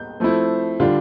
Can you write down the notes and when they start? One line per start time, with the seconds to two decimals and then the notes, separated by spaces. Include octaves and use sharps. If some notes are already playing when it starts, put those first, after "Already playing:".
Already playing: G6
0.20 F3 A3 C4 E4
0.80 D3 G3 D4 F4